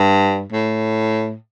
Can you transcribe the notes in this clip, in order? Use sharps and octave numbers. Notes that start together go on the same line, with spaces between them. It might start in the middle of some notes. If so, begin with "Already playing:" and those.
Already playing: G2
A2